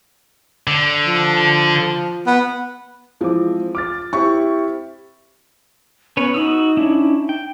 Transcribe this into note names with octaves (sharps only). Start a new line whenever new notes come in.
D3
F3
B3
E3 F3 G#3 C4 D6
D6 F6 A6
C4 E4 G4 C#6
B3 C#4 B4 C#5
D#4 F#4 D#6 E6
C#4 D4 E4
G5